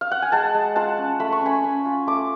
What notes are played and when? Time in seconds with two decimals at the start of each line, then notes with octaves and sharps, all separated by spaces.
0.01 F5
0.11 F#5
0.22 G#5
0.32 G#3 F#5 A5
0.54 G#3
0.76 F4 F#5 A5
0.97 C#4
1.20 A3 B5
1.32 C#6
1.41 C#4 G#5 B5
1.64 C#4
1.85 F4
2.07 A3 D6